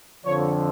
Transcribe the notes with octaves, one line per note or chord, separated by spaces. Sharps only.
F2 D3 F3 C#5